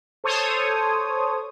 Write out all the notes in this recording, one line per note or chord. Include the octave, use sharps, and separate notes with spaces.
A4 C5 C#5 D#6